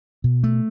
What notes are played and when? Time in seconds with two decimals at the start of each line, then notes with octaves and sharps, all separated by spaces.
0.24 B2
0.44 A3